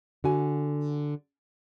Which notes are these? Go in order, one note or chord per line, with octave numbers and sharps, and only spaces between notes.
D3 F#4 G#5